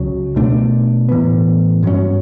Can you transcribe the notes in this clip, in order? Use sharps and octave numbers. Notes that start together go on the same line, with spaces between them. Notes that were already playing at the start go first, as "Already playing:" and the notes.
Already playing: C#2 C#3 F#3
B2 A3 D4
A2 E3 B3
G2 F#3 C#4